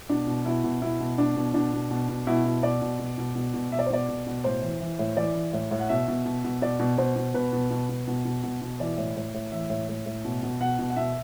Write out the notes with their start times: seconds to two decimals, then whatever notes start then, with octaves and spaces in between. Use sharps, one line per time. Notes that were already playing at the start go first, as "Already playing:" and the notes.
0.09 B2 D4
0.27 B2
0.45 B2 E4
0.64 B2
0.82 B2 E4
1.00 B2
1.18 B2 D4
1.36 B2
1.54 B2 D4
1.73 B2
1.91 B2
2.09 B2
2.27 B2 E4
2.45 B2
2.63 B2 D5
2.82 B2
2.99 B2
3.18 B2
3.35 B2
3.54 B2
3.71 B2 E5
3.79 D5
3.86 C5
3.90 B2 D5
4.08 B2
4.26 B2
4.44 A2 C5
4.62 E3
4.81 E3
4.99 A2
5.17 E3 D5
5.35 E3
5.53 A2
5.71 A2
5.79 F#5
5.89 B2 E5
6.08 B2
6.25 B2
6.44 B2
6.62 B2 D5
6.79 B2
6.98 B2 C5
7.16 B2
7.34 B2 B4
7.53 B2
7.71 B2
7.89 B2
8.07 B2
8.25 B2
8.43 B2
8.62 B2
8.80 E3 D5
8.97 A2
9.16 A2
9.34 A2
9.52 E3 E5
9.70 A2
9.89 A2
10.06 A2
10.25 B2
10.43 B2
10.60 B2 F#5
10.79 B2
10.90 F#5
10.96 B2 E5